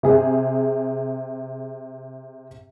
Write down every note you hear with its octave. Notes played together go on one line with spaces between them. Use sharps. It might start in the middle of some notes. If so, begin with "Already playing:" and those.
C3 G#4